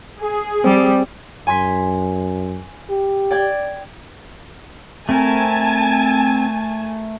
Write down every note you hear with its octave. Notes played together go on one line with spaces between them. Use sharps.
G#4
G3 C4
F#2 G#5 C6 B6
G4
D5 G5 G#6
A3 C4 A#4 G#5 A5